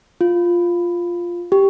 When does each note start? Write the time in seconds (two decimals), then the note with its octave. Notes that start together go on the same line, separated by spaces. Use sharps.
0.21 F4
1.52 G4